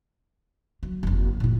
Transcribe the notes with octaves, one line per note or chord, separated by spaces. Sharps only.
F#3
F#1 F2
A#2 E4